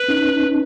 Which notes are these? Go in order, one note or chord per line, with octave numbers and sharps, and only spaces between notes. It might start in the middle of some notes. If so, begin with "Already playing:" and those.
Already playing: B4
C#4 D#4